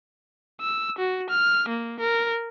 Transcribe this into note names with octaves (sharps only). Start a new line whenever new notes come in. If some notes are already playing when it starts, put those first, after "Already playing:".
E6
F#4
F6
A#3
A#4